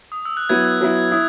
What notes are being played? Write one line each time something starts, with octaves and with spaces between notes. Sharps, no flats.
D#6
E6
F#6
F#3 B3 E4 G#6
F#6
F#3 B3 E4
E4 D#6